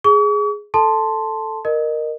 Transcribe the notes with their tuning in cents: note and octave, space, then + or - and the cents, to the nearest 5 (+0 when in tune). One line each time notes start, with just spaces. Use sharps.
G#4 +0 C#6 +45
A4 +0 A5 +0 C6 +0
A#4 +0 D#5 -20